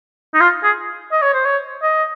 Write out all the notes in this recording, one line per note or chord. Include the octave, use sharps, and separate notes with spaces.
D#4
F4
G#4
D#5
C#5
C5
C#5
D#5